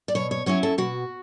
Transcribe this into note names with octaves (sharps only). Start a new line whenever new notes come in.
D5
B2 C#5
C#5
F#3 C#4 E4 C#5
A4
B2 F#4